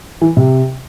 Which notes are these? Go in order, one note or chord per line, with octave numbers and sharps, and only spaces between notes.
E3
C3